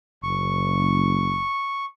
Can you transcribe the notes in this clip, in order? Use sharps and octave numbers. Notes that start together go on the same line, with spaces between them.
F#1 C#6